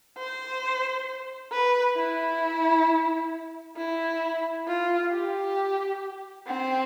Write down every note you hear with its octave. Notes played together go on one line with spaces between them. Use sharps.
C5
B4
E4
E4
F4
G4
C4